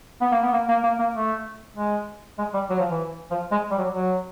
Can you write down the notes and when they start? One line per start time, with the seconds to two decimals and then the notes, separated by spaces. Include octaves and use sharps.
0.21 B3
0.32 A#3
0.42 B3
0.52 A#3
0.68 A#3
0.83 A#3
0.99 A#3
1.15 A3
1.76 G#3
2.38 G#3
2.54 G3
2.70 F#3
2.79 F3
2.90 E3
3.31 F3
3.51 G#3
3.71 G3
3.78 F#3
3.93 F#3